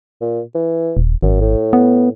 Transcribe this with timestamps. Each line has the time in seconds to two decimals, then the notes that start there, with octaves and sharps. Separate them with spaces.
0.21 A#2
0.55 E3
0.97 D#1
1.23 G#1 F#2
1.41 A2
1.73 B3